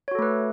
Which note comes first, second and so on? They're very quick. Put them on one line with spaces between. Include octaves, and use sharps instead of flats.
C#5 F#4 A4 A3 B4